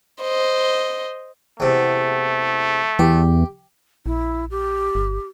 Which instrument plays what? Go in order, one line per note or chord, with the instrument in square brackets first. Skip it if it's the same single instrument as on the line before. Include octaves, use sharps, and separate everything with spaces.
[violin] C5 D#5
[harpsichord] E2 C3 [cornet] A3
[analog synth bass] E2 [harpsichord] G4
[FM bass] A#1 [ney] E4
[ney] G4
[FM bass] G1